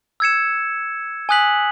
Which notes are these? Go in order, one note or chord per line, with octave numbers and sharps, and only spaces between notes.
E6 G#6 C#7 E7
G#5 D#6 F#6 B6 F#7